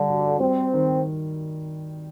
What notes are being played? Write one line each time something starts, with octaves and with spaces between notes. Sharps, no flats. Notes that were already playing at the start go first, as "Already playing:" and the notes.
Already playing: D3 G3
F#4
G3 C4
D#3